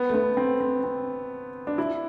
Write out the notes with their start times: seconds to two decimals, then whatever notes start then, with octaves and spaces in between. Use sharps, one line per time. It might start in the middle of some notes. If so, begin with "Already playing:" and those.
Already playing: B3
0.09 A3
0.14 B3
0.37 C4
0.61 C4
0.84 C4
1.67 D4
1.78 E4